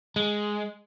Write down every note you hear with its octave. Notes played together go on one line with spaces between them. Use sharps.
G#3